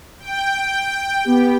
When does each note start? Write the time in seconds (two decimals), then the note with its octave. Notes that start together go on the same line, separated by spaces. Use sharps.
0.19 G5
1.24 B3 G4